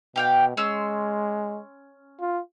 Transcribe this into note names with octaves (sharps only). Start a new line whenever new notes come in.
B2 G4 F5 G5
G#3 C#4 C6 E6
F4